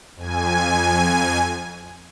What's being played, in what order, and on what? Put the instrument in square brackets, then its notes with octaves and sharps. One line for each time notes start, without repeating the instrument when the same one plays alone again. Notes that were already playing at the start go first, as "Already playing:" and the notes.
[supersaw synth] F2 G#5